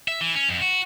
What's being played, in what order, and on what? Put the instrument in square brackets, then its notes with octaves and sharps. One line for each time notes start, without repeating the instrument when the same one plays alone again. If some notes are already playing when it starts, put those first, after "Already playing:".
[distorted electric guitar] E5
E3
C#4
F2
F#4